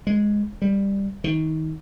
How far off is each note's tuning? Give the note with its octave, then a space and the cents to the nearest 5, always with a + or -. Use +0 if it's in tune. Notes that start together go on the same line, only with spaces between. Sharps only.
G#3 +0
G3 +15
D#3 +25